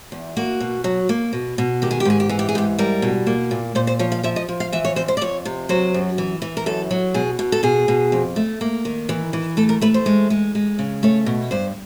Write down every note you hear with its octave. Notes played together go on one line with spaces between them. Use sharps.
E2
A#3 F#4
B2
F#3
A#3
B2
B2
D#3 G4
G#4
G4
G#2 G#4
G4
E3 G#4
G4
G#4
G#2 G4
G3 A#4
B2
A#3
A#2
A#2 C5
C5
F3 C#5
F5
F3 E5
D#5
F3
F5
E3 E5
C#5
F2 C5
C5
D5
F2 C#5
C3
F#3 C5
F#2
E3
E3
A#4
F#2 A4
F#3
B2 G#4
B2
A4
B2 G#4
B2
F2
A3
A#3
D#3
E3
E3
A3 A4
A#4
A3 B4
C5
G#3
G#3
G#3
C#3
A3 C#5
B2
G2 C5